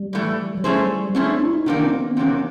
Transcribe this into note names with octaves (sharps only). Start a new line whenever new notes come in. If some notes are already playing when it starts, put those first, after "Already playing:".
Already playing: G3
A2 E3 A3
F#3
G3 A3 C#4 E4 G#4 C5
A3 C4 C#4 E4 G#4 C5
D4
E4
D#4
E2 C3 D#3 F#3 A#3 D4
C4
C4
B3
E2 C3 D#3 F#3 A#3 C#4